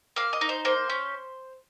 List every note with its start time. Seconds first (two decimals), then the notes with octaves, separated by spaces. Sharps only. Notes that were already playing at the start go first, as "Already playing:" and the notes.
0.16 A#3 F5
0.33 D#5
0.41 D#4
0.49 C5
0.65 A#3 C5
0.90 C#4